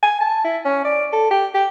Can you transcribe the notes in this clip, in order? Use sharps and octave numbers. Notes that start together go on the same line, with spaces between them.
G#5
A5
E4
C#4
D5
A4
G4
G4